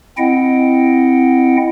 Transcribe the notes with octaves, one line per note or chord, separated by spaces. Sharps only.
C4 E4 D#5 F#5 G5